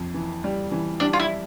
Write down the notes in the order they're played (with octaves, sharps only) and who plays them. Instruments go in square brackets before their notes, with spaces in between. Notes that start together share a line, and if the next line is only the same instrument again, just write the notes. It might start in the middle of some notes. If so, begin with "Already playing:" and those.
Already playing: [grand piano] F2
E3
G3
E3
[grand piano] G3 [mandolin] D4
[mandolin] F4
E4